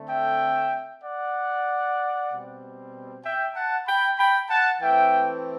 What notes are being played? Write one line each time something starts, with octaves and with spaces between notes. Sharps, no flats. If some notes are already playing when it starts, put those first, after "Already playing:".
Already playing: D3 A3 C4
E5 G5
D5 F#5
B2 G3 C4
E5 G5
F#5 A5
G5 B5
G5 B5
F#5 A5
E3 A3 C4 E5 G5